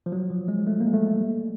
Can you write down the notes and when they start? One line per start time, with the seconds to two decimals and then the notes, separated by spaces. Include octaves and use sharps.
0.06 F3
0.12 F#3
0.30 F3
0.48 G#3
0.67 A3
0.80 A#3
0.86 G#3
0.94 A3
1.07 A3
1.21 G3